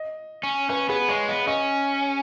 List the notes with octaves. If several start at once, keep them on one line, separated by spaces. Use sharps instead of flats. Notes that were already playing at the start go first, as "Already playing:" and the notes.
Already playing: D#5
C#4
C#4 B4
B3 G#4
G#3 C#5
B3 D#5
C#4 D#5